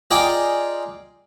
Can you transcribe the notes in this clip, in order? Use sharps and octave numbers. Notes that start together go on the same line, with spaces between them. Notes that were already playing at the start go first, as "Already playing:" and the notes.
F4 G#4 D5 D#5 G5 A#5